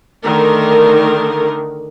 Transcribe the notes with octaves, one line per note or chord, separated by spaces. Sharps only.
D3 D#3 A3 A#4